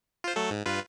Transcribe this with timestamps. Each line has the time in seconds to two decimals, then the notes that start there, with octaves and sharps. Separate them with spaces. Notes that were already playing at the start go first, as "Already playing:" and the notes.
0.24 F4 C5
0.36 F#3 A3 A4
0.50 G#2
0.66 G2 F4 B4